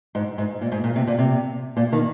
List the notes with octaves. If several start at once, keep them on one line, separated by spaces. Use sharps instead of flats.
G#2
G#2
A#2
G#2
A#2
C3
A#2
C3
A#2
D#3